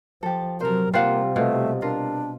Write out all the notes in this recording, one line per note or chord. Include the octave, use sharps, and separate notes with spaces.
F3 G4 A4
C3 F#3 A4 A#4 C5
C3 G3 A#3 F4 G4 C5 F5 F#5
B2 A3 F4
D4 F4 A#4